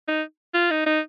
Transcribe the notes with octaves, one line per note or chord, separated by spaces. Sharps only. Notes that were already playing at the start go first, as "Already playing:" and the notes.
D#4
F4
D#4
D#4